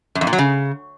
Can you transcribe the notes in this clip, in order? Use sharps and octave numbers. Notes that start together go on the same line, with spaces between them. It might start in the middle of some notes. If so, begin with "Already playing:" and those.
F#2
F2
A#2
F#3
C#3